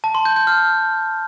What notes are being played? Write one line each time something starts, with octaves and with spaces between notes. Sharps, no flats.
A5
C6
G6
G6
F6